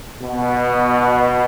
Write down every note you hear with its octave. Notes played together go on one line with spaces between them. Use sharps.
B2